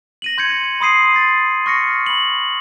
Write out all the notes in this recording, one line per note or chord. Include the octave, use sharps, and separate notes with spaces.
A#6 D#7 F#7
C6 G6 G#6 C#7
B5 C6 D#6 C7 D#7
A6
C#6 F6 A#6 C#7
B5 F#7